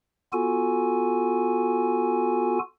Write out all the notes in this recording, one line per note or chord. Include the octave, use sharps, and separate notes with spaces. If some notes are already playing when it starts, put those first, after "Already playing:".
B3 F4 F#4 A4 G#5